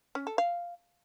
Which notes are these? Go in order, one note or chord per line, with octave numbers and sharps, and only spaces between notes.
C#4
A4
F5